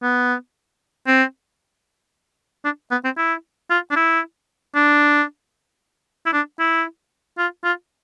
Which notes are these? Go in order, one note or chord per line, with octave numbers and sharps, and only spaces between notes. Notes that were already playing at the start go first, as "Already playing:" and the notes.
B3
C4
D4
B3
C4
E4
F4
D4
E4
D4
E4
D4
E4
F4
F4